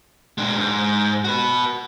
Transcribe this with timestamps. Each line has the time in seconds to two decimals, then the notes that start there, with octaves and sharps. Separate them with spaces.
0.38 G#3 D4
0.58 G#2
1.24 F#4 B4